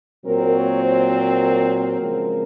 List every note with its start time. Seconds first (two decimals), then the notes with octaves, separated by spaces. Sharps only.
0.25 A#2 F#3 C4 A#4
0.54 C#5
0.83 C5
1.12 A#4
1.99 C#3 F3 G#3 C4